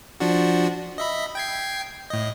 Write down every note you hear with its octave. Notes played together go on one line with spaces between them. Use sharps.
F3 D4 F#4
D#5 E5 B5
G5 G#6 C7
A2 D#5